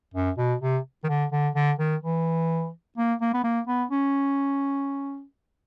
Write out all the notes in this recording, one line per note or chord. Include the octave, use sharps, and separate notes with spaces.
F#2
B2
C3
D#3
D3
D3
D3
D#3
E3
A#3
A#3
B3
A#3
B3
C#4